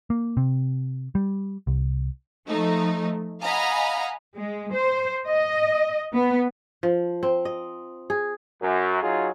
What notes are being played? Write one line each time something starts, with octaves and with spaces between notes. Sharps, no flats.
A#3
C3
G3
C2
F3 A3 D#4
D#5 F5 F#5 G#5 A#5 B5
G#3
C5
D#5
B3
F3
C4
D#5
G#4
F#2
F#3 D#4 F4 F#4 G#4